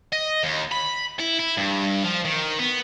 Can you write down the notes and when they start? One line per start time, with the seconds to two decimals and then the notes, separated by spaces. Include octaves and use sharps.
0.13 D#5
0.43 D#2
0.72 B5
1.19 E4
1.39 E4
1.57 G2
2.04 F3
2.25 D#3
2.59 B3